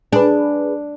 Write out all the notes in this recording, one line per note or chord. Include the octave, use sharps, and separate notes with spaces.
D4 G#4 B4